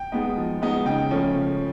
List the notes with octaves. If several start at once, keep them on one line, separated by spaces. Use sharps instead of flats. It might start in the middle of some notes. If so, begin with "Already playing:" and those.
Already playing: G5
G#3 B3 D#4
F3
G#3 B3 D#4
C#3 G5
F3 A3 C#4
C#3